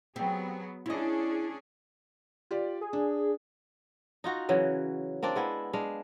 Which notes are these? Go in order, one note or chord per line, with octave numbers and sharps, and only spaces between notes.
F#3 B3 C4 G4 G#4
C#4 D4 E4 G#4 D#5
F4 G4 D5
G#4
D4
D#4 F4 F#4
C#3 E3 F#3
A#3 C4 D4 D5
G#3 B3 E4
G#3 D4 F5